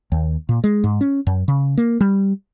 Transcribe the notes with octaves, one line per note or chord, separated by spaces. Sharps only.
D#2
A#2
G#3
G#2
C#4
F#2
C#3
A#3
G3